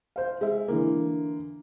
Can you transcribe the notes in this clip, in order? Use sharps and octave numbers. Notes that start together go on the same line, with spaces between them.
C5 F5
G#3 E5
D3 E3 A#3